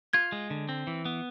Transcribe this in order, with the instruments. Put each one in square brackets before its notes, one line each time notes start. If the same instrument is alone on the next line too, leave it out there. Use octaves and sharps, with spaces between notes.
[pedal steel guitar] F4 [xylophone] G#6
[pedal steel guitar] G#3
D3
C4
E3
B3